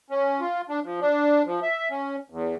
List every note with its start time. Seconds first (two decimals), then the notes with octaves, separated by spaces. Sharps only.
0.10 C#4
0.41 F4
0.69 D4
0.84 F3
1.01 D4
1.46 F3
1.63 E5
1.90 C#4
2.30 E2